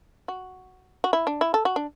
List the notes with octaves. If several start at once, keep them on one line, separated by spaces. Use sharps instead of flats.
F#4
F#4
E4
D4
E4
A4
F#4
D4